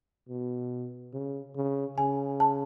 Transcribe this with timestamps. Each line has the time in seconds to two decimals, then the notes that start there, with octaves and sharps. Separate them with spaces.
0.29 B2
1.13 C#3
1.56 C#3
1.98 C#3 G#5
2.40 A5